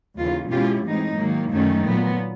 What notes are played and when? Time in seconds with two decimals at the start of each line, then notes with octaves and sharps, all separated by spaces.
0.17 D#2 C#3 E3 F4
0.51 B2 G#3 C#4 E4 F4 G4
0.84 A2 E3 G#3 C4 D#4
1.17 G#2 D#3 F#3 A#3
1.50 F#2 D#3 F#3 A3 C#4
1.84 A#2 F#3 B3